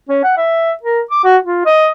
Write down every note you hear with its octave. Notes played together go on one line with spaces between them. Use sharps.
C#4
F#5
E5
A#4
D6
F#4
F4
D#5